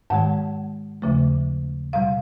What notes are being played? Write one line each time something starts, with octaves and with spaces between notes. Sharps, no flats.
G#2 D#3 G#3 F#5
D#2 C#3 F3 A3
B2 G3 F5